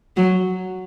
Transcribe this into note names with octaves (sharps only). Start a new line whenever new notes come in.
F#3